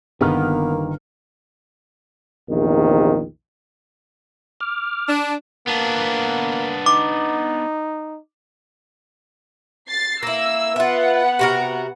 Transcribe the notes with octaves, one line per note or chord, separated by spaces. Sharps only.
G1 D#3 A#3 B3 F6
A#1 E2 C3 D#3
D6 F6
D4
A#3 B3 D4
D#4 D6
A6 C7
A#3 E4 E6
B3 F4 E5 F#5
C3 F#4 A#4